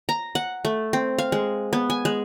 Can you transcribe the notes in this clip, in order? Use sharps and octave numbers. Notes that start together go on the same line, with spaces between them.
A#5
F#5
A3
C4
F5
G#3
B3
G#5
G#3